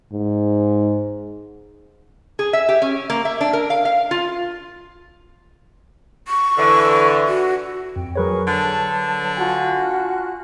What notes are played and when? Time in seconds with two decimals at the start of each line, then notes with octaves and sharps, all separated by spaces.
0.13 G#2
2.39 G#4
2.53 E5
2.69 G4
2.82 C#4
3.10 A#3
3.25 E5
3.41 D4
3.53 A#4
3.70 F5
3.85 F5
4.11 F4
6.28 C#6
6.57 D3 E3
7.28 F#4
7.96 F2 G5
8.16 F#3 G#4 A#4 B4 C#5 C#6
8.47 D3 A5
9.37 F4 F#4 G#5 A5 F#6